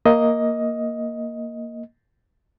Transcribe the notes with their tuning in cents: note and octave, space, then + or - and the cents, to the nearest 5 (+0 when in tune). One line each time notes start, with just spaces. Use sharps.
A#3 +0 D#5 +10